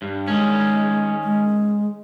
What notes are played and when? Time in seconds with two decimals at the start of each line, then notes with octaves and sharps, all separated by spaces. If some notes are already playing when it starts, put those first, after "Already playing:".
0.02 G2
0.27 D#3 G#3 C#4
1.24 G#3